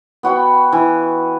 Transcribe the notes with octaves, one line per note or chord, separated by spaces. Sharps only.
B3 F#4 G5 B5
E3